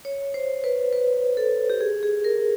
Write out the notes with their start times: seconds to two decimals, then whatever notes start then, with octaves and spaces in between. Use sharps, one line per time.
0.05 C#5
0.34 C5
0.64 B4
0.93 B4
1.37 A4
1.70 G4
1.81 G#4
2.03 G#4
2.24 A#4